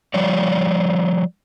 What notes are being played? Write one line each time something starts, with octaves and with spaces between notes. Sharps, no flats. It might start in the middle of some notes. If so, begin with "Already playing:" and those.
F3 G3 C#5 D5